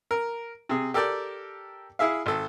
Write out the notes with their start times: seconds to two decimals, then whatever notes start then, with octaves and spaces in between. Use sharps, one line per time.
0.11 A#4
0.69 C3 G#4
0.94 G4 A4 A#4 D5 G5
1.99 E4 G#4 E5 F5
2.26 G#1 A4